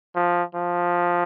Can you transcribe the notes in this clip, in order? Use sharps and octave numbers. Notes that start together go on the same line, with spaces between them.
F3
F3